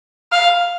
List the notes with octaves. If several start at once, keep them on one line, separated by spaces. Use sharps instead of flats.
F5